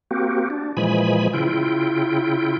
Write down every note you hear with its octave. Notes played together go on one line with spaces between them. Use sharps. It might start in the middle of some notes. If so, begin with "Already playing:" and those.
A#3 C4 F#4 G4
D4
A#2 E3 F3 G#3 G#5 B5
C#3 E4 F4 G5